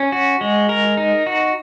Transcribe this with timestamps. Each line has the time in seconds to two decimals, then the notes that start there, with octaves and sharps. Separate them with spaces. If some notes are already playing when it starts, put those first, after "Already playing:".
Already playing: C#4
0.12 F#4
0.41 G#3
0.69 A#4
0.97 D#4
1.27 F#4